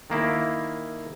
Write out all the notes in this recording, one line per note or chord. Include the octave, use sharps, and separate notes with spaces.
D#3 A#3 E4